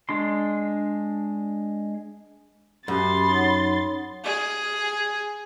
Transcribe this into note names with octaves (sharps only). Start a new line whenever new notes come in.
G#3 D4 C6
F#2 G4 B5 C6 A6
D#4 C#5 F#5
G#4